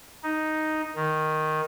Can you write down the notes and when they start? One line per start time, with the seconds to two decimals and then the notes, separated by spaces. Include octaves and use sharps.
0.23 D#4
0.95 D#3